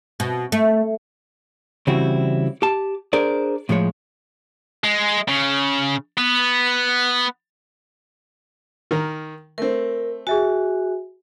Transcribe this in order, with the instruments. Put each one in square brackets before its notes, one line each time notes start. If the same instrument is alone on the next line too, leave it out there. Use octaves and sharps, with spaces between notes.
[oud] B2
A3
[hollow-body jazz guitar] C#3 E3 G3 C4 E4 F#4
G4 A5
D4 G#4 A#4 C5 D5
A2 F3 G#3 C#5
[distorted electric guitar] G#3
C#3
B3
[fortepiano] D#3 A#4
[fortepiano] A3 C4 [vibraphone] A#4
[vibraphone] F#4 [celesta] G#4 E5 G#5